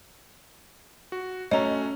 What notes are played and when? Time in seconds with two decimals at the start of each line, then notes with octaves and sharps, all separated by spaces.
1.12 F#4
1.51 A3 C#4 F#4 C#5 D#5 A#5